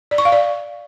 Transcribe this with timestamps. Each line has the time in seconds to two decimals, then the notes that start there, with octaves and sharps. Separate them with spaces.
0.11 D5
0.18 C#6
0.25 F5
0.32 D5